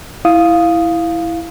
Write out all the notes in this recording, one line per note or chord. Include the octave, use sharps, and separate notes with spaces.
E4 F5 D#6